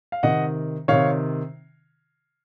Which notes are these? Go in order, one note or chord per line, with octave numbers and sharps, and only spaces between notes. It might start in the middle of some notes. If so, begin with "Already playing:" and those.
F5
C3 D#3 D#5 F#5
C3 D#3 C#5 F5